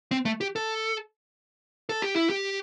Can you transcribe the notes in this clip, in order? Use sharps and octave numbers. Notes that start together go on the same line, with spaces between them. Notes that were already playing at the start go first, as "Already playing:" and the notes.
C4
A3
G4
A4
A4
G4
E4
G4